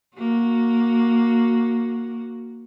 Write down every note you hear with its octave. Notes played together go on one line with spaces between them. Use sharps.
A#3 F#4